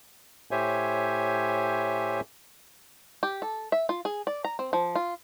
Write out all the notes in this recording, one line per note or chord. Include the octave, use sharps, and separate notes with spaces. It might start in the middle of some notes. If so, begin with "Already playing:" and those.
A2 G4 C5 C#5 E5 G#5
G4
A4
E5
F4
G#4
D5
A#5
C4
F3
F4